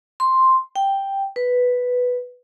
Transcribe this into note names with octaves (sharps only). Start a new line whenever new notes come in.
C6
G5
B4